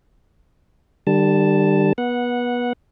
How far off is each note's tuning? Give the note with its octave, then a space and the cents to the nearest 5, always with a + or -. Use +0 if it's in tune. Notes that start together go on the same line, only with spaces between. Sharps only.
D3 +45 G3 +0 A5 +0
B3 -25 F#5 -10